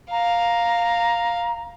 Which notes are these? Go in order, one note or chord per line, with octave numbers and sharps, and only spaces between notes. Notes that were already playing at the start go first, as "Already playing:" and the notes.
F5 A#5